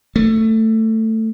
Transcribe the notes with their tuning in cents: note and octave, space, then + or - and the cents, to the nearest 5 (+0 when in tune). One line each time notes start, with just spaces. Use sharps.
A3 +15